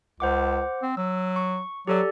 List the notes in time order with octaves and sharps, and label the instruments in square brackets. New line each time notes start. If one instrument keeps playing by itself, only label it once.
[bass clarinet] C#2 [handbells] C5 F#5 D6
[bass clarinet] C4
[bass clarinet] F#3 [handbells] E6
[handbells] C#6
[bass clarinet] F#3 [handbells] G4 A4 D5